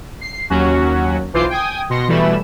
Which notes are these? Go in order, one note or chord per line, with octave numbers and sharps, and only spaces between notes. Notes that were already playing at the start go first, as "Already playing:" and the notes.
C7
D#2 F#3 C#4 F#4
B1 E3 F4 C5 D6 C7
G5 G#5 D#6
B2 C6 A#6 C#7
B2 E3 G3 A3 B5 E7